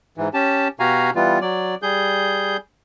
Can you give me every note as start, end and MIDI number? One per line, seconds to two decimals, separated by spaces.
0.18 0.29 44
0.18 0.29 52
0.34 0.68 61
0.34 0.68 67
0.34 0.68 81
0.80 1.10 47
0.80 1.10 66
0.80 1.10 67
0.80 1.10 77
0.80 1.10 80
0.80 1.10 82
1.15 1.39 52
1.15 1.39 55
1.15 1.39 59
1.15 1.39 65
1.41 1.75 54
1.41 1.75 74
1.82 2.57 55
1.82 2.57 68
1.82 2.57 91